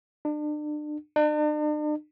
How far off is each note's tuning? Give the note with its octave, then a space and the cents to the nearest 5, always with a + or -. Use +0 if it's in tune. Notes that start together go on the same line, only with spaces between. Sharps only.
D4 +35
D4 +45